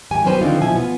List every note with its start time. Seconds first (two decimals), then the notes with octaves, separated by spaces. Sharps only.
0.11 G#2 D#3 G4 G#5
0.24 F#3 G3 B3 C#4 B4 C5
0.41 D3 D#3 F3 C4 D#4 F4
0.61 B2 F3 E4 G#5
0.76 B3 F4